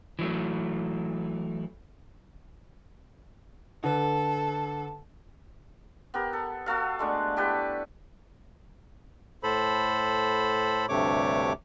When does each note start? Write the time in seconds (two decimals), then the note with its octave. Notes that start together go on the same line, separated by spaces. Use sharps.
0.19 E3 F#3 A3
3.84 D3 A4 B4
6.14 B3 G4 A#4
6.33 A4
6.66 B3 F#4 A4 F5
6.99 G#3 A3 D4
7.36 E4 G4 A4 B4
9.43 A2 A4 C5 B5
10.89 D2 G2 C3 A3 C#5 D6